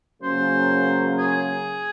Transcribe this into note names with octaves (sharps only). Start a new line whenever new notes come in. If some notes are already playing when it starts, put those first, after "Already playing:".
C#3 F#3 A#3 C#4 C5
G#4